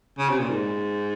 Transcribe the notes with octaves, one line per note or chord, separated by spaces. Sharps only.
C#3
C3
A#2
G#2